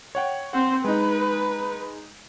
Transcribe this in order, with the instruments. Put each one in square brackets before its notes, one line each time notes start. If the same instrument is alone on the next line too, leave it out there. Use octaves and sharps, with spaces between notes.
[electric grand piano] C#5 F#5 G5
[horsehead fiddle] C4 C5 [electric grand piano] F#5
[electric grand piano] G#3 D#4 [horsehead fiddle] B4